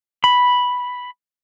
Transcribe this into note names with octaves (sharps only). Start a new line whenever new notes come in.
B5